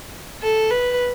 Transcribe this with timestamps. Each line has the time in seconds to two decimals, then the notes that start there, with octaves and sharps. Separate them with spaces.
0.42 A4
0.71 B4